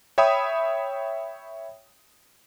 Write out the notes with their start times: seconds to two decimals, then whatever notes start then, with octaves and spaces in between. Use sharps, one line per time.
0.18 C#5 E5 G5 B5 D#6